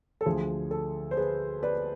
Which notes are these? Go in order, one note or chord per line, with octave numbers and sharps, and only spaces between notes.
A4
D2 D3 F3 G#4
A4
C5
G#4 B4
B4 D5